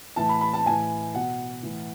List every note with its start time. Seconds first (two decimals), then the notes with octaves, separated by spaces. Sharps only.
0.16 A2 E3 A5
0.29 B5
0.41 B5
0.54 A5
0.66 A2 E3 G#5
1.15 B2 F#5
1.63 A2 E3